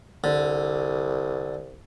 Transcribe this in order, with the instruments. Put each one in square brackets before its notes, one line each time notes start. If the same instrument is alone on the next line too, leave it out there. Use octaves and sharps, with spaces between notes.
[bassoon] C2 [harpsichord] D3